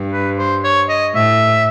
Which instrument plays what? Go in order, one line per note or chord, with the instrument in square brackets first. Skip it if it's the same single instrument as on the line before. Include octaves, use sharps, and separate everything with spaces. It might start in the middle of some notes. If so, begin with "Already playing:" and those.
Already playing: [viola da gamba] G2
[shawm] B4
C5
C#5
D#5
[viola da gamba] A2 [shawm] E5